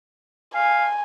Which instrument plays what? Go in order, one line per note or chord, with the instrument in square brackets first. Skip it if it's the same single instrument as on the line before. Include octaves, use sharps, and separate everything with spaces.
[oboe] F5 [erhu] G#5